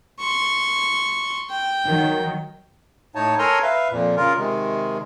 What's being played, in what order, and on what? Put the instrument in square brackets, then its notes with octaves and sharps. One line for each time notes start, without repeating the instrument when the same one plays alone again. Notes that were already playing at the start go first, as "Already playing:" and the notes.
[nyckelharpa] C6 C#6
G5
[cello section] D#3 F#3
[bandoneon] A2 D#4 C#5 A5
A4 A#4 C#5 G#5 A#5 C6
B4 E5 F5
F2 A#2
C#3 F4 A#4
C3 D#3 G#3